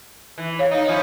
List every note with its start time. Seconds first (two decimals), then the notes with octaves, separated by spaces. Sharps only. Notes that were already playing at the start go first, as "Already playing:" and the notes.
0.38 E3
0.59 C#5 F5
0.71 D#4
0.89 F3 C#4 E4